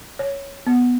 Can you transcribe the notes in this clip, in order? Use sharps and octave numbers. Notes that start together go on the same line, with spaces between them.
C#5
B3